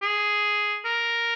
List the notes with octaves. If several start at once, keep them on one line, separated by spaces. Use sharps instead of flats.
G#4
A#4